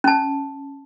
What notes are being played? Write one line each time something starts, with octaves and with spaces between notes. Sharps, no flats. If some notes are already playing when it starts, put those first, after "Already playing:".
C#4 A5